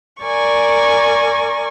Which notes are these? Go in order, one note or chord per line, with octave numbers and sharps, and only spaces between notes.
A#4 D5 G#5 C#6